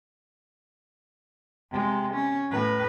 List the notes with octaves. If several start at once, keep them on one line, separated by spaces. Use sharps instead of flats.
C3 G#3
C#4
A2 B4